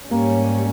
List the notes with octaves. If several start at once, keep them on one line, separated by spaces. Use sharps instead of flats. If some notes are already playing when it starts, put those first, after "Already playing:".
G#2 G3 A#3 C#4